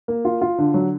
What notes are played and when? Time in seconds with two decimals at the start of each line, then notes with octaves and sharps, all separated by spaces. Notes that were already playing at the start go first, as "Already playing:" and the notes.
0.08 A#3
0.25 F4
0.41 F4
0.58 D3
0.74 F#3